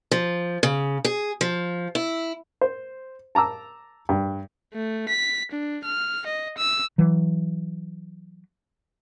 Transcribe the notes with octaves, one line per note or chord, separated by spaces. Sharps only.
F3
C#3
G#4
F3
E4
C5
A5 A#5 D6 E6
G2
A3
B6
D4
F6
D#5
E6
E3 F#3